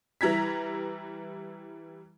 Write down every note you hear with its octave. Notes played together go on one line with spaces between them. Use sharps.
E3 G3 E4 A#5 G#6 B6